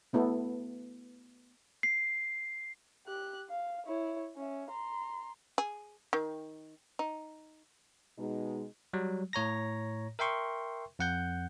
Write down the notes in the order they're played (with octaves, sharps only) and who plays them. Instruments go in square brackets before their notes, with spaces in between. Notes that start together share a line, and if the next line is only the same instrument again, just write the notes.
[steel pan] A3 B3 E4 A4
[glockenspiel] C7
[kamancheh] G4 F#6
F5
E4 C#5
C#4 E5
A#5 C6
[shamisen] G#4
D#3
D#4
[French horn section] B2 G#3 D#4
[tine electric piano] F#3 G3
A2 C#5 A#5 A#6
A#4 E5 G5 C6 C#6
F2 F#5 G6